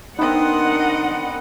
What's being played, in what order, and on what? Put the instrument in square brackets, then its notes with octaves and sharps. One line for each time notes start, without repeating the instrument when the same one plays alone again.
[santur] B3 C4 [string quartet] D4 A#4 D#5 [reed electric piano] D#4 [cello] F#5